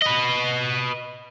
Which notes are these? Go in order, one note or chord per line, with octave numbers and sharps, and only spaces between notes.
B4 D#5